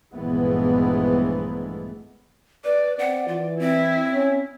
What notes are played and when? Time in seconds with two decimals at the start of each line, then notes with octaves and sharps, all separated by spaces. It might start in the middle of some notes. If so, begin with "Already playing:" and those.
0.13 A#1 G2 E3 G#3 A3 B3
2.64 B4 D5
2.99 C4 D5 F#5
3.28 E3 F4
3.59 C4 E4
4.12 C#4